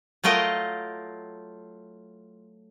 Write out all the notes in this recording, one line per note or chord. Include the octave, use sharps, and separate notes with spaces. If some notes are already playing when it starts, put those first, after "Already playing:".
F#3 A3 F4 A#4 D#5 G5